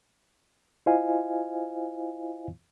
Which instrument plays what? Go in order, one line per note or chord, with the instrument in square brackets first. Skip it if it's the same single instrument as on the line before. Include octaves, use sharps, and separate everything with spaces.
[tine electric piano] E4 F4 C5 D#5 F5 G#5